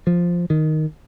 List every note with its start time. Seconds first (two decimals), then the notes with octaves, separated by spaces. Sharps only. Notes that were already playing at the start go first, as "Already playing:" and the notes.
0.07 F3
0.50 D#3